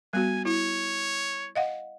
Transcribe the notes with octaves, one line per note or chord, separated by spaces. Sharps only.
G3 B3 F#4 G#5
E4 C#5
D#5 F5 F#5